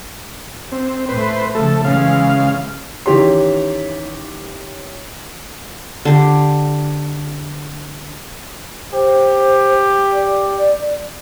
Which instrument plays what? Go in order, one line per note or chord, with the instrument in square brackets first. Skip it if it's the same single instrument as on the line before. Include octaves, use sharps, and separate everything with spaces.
[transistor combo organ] C4
[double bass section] A2 A3 [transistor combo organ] B4 C5
[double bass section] C#3 F3 [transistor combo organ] A3 A4
[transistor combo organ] C#3 F5 [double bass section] E3 G#3 C#4
[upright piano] D#3 E3 C#4 G4 C#5 C6
[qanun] D3 G4
[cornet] G4 [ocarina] C5
[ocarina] D5